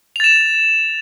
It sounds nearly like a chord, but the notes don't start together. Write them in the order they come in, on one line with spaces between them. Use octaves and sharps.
F7 A6 E7